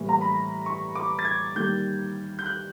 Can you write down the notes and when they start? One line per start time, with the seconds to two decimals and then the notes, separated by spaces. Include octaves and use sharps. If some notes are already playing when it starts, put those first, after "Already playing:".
Already playing: A2 E3 G3 A#3
0.09 A#5
0.21 B5
0.66 C#6
0.95 D6
1.19 A6
1.25 G#6
1.55 D#3 G3 A#3 G6
2.39 G6
2.46 F#6